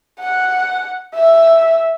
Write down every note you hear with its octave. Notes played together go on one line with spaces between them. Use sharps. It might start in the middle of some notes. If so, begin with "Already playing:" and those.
F#5
E5